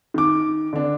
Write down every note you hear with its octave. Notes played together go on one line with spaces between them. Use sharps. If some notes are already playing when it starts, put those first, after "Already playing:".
D#3 D6
D3 D4